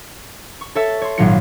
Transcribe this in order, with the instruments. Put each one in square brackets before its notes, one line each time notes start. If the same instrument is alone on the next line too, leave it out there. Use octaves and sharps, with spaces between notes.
[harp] C#6
A4 C#5 E5 C#7
C#5 C6
G#1 A#2 F#3 A#3 F4 C#7